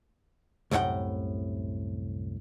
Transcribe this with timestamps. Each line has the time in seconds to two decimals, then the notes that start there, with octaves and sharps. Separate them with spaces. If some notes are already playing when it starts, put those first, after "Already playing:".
0.71 C2 F#2 A2 F#5 G5